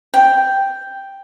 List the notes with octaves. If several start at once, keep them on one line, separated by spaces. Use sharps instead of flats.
G5